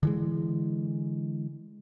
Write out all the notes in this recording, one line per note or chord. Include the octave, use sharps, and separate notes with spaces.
D3 E3 G#3